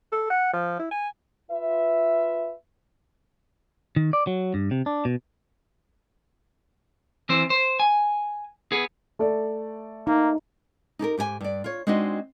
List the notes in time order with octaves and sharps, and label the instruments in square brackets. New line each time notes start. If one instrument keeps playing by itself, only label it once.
[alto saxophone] A4
F#5
F3
E4
G#5
[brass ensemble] F4 B4 E5
[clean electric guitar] D#3
D5
F#3
G2
C3
D4
B2
E3 C4 C5
C5
G#5
B3 G#4
[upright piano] A3 A4 D5
[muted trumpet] A#3 [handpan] D#4
[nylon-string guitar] D#4 G4 A4 A#4
G#2 G4 A#4 G#5
G2 D5
F4 C#5
G#3 C4 D4 D#4 F#4 D#5